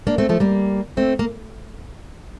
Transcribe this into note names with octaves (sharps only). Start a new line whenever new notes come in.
A#3 D4
A3 C4
F3 A3
G3 A#3
A3 C4
A#3